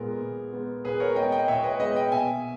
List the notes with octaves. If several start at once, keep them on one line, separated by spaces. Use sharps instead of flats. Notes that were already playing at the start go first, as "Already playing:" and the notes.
Already playing: A#2 G#3 B3 A#4
A#2
G#3 B3
A#2 G#4 B4
A#4 C#5
G#3 B3 D#5 G5
D#5 G5
A#2 C#5 E5
B4 D#5
G#3 B3 B4 D#5
D#5 G5
B2 E5 G#5